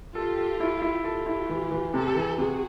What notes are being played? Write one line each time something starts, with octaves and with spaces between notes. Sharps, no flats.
F4 G4 A4
A4
E4
E4
F4 G4 A4
E4
E3
E3
C3 G4 A4
E3
C3 F#4 G#4